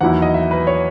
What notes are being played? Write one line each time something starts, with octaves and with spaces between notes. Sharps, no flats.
E2 D#3 F#3 A#3 E4 F#5
D#5
E5
B4
C#5